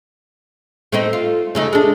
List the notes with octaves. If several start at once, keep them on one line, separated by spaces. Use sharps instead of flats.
A3 C4 D#4
F4
C#3 A3 D#4
G#3 D4